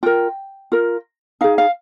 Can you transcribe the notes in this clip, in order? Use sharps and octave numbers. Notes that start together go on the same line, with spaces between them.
F4 A#4 G5
F4 A#4
D#4 G#4 F5
F5